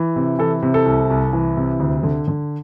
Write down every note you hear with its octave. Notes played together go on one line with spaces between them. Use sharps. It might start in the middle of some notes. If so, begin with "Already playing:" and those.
Already playing: E3
C3
E3 A4
C3
A4
C2
C2
E3
C3
D2
D3
D3